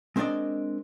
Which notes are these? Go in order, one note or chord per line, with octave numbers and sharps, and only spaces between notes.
G#3 C4 D4 A#4 D5 D#5